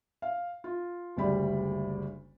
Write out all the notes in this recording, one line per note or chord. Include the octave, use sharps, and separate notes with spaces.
F5
F4
F#1 D2 C#3 G3 D5 B5